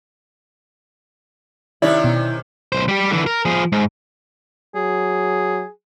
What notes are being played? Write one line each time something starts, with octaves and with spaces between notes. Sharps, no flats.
C3 D#3 C#4 E4 D5 E5
B2
B1 C5
G3 G4
D3 E3
A#4
F3 G#4
G#2
F#3 G#4